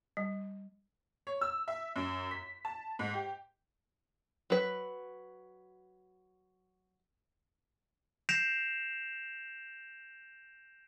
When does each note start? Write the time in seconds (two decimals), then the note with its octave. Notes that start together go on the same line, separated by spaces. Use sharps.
0.17 G3
1.27 C#5
1.41 E6
1.68 E5
1.96 F#2
2.31 B6
2.65 A5
2.99 G#2
3.14 G4
4.50 F#3 B4
8.29 G6 A#6 C7 D7 E7 F7